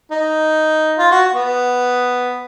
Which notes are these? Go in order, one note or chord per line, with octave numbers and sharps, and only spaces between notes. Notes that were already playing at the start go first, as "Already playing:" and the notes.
D#4
F4
F#4
B3